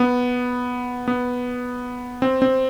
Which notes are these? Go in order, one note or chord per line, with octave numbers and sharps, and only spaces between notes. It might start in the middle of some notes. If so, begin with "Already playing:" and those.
Already playing: B3
B3
C4
C4